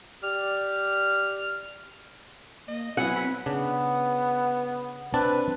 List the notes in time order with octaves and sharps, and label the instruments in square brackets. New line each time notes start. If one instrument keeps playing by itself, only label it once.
[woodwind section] G4 D5 F6
[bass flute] A#3 [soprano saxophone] D#5
[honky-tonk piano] F#3 B3 E4 [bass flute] C4 [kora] F#5 [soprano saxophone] G#5
[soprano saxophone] B5
[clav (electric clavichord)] C#3 D4 [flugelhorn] B3
[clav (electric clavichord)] C4 D4 A5 [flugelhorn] B4